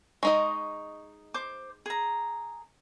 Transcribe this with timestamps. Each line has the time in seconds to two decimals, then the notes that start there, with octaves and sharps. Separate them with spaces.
0.23 G#3 D#4 D#5 C#6
1.34 C5 D6
1.86 G#4 A#5